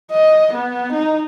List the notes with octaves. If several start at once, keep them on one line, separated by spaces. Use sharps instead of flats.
D#5
B3
D#4